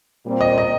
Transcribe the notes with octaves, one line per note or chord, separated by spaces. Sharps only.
A#2 G3 C4
D#5
D#5